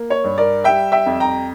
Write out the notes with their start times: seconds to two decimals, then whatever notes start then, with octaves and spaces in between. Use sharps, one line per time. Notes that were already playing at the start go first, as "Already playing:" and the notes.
Already playing: A#3
0.10 C#5
0.24 G2
0.38 A#4 D5
0.64 G3 E5 G5
0.92 E5 G5
1.06 F2
1.20 G5 A#5